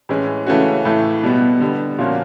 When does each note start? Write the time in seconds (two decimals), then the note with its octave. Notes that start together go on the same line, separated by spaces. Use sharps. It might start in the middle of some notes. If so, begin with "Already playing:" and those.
0.09 A2 E3 G#3 C#4
0.47 C#3 E3 A3 C#4 F#4
0.85 A2 E3 A3
1.23 B2 G3 B3
1.61 D3 G3 B3
1.99 A#2 F3 A#3 C#4 F#4